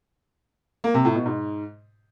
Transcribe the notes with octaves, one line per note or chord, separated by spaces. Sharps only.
A#3
C3
A2
B2
G#2